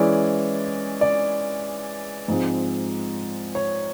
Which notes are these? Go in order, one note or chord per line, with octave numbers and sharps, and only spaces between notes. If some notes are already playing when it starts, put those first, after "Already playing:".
Already playing: E3 G#3 C#4 E4 D5
D5
G#2 F3 G#3 C4
C#5